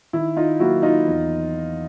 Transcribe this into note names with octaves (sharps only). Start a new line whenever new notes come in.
D#3 E4
D#4 F4
F#3 A#3 D#4 E4 F#4
D#4 F4
E2